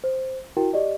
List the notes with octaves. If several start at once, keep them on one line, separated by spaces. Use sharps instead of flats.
C5
E4 F#4 A#4 G5
G4 D5 D#5